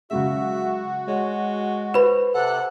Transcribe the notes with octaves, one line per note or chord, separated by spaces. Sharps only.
C#3 F#3 G#3 F#4 E5
G#3 C#5
B4 C5 B5
C3 A4 F#5 F#6